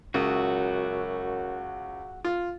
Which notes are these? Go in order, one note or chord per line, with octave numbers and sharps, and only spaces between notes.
C#2 F#2 F#4 E5 D#6
F4